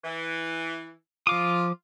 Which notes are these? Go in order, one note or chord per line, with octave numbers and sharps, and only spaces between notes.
E3
F3 F4 D6 D#6